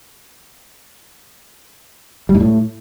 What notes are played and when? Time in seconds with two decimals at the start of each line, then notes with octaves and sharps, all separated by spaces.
2.29 G3
2.35 G#2
2.40 A2